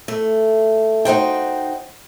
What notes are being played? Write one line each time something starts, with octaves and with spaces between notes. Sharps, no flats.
A3
D#4 F#4 C5 G5